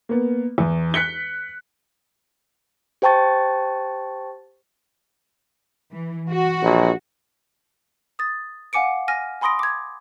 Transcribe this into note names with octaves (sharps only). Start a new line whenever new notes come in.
A#3 B3
E2
F#6 B6 C#7 G7
G4 C5 G5 A5 C#6 A6
E3
F#4
A#1
D#6 A6
F5 F#5 G#5 D6 C#7 D7
G#5 F6 A#6 D#7
G#5 B5 C6 D#6 A#6 D7
D6 G#6